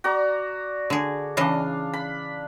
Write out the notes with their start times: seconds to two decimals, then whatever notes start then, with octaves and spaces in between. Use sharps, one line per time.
0.04 F#4 D5 A#5
0.90 D3 G#4
1.37 C#3 E3 D4 D#5 F5
1.93 B5